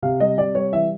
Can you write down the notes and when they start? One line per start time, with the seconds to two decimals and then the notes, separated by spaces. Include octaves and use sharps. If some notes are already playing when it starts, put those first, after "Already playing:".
0.02 C3 F5
0.20 G3 D#5
0.38 C3 D5
0.55 G3 C#5
0.73 E3 E5